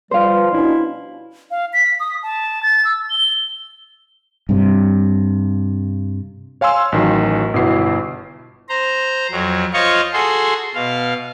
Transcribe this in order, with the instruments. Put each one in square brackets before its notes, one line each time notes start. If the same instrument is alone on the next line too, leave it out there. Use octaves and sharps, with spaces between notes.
[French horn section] F3 B4 [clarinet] G3 [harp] C5 F5
[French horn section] B2 C#4 D4 [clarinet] E4
[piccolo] F5
B6
D#6
A5
A6
E6
G7
[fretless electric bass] G2 C3
[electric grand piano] C#5 F5 G#5 C6 E6
A1 D#3 F#3
G1 B2 E4 C7
[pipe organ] C5 A#5
F2 F#3
F4 C5 C#5 D#5 F5 C#6
F#4 G#4 A4 C6
B2 F5